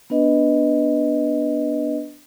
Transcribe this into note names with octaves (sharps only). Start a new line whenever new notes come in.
B3 D4 B4 D#5